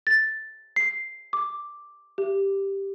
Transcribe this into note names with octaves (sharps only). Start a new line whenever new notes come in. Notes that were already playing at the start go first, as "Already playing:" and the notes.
A6
C7
D6
G4